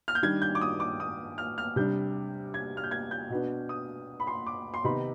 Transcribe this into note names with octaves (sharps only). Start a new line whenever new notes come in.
F6
G6
D#3 G3 D4 G#6
G6
D6
D#6
D6
D#6
F6
F6
C3 G3 D4 G6
G#6
F6
G6
G#6
G6
B2 B3 D4
D#6
B5
C6
D6
C6
C3 D#3 B3 D#4 B5